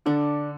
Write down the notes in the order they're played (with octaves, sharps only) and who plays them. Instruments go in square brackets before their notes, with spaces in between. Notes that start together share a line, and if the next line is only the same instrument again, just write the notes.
[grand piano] D3 [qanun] D4